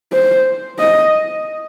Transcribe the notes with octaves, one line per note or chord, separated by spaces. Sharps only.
C5
D#5